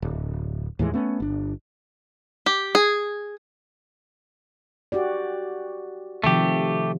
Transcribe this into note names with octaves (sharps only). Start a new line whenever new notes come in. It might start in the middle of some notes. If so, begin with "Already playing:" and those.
D1
D#2 A2 E3 G#3
A3 B3 C#4
G1 D4
G4
G#4
F#4 G4 D5
C3 D#3 F3 A3 G4